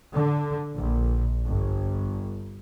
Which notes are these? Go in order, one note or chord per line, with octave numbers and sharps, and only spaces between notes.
D3
A#1
G1